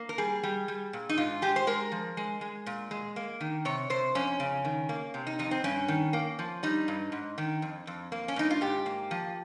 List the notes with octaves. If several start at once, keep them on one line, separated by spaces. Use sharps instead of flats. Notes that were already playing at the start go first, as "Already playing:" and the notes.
Already playing: A#3
A#4
G3 G#4
G3
G3
A#2
D#4
G#2 F4
G#3 G4
C5
G#3 A#4
F3
G#3
G#3
A#2
G#3
A#3
D#3
C3 C#5
C3 C5
F2 C#4
C#3
D#3
A#3
C3
D#4
F2 D#4
C4
G2 C#4
D#3
A#3
F3
G3 D#4
G2
G#2
D#3
F2
F2
A#3
C#4
G2 D#4
F4
G#2 G4
A#3
F3